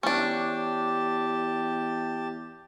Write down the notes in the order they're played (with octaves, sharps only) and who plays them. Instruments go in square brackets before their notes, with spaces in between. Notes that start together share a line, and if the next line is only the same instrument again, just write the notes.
[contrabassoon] E2 [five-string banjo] C#4 D4 [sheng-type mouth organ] G4 A5